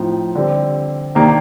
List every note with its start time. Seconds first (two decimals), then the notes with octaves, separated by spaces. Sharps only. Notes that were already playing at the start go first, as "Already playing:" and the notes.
Already playing: A2 F3 C4 D#4
0.35 D3 G3 C4
1.15 C3 D#3 A#3 D4